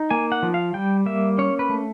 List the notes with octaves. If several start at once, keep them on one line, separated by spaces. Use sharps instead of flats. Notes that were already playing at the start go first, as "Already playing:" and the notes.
Already playing: D#4
A#3 G#5
F#5
F3
F5
G3 G5
A#3 E5
C#4 C#5
B4
A3